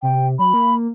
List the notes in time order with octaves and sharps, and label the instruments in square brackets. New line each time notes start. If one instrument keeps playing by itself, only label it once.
[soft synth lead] C3 [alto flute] G5
[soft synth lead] F#3 [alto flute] B5
[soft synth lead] A#3